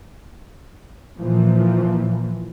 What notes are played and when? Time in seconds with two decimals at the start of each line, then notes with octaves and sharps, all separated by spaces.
1.19 A#2 E3 F3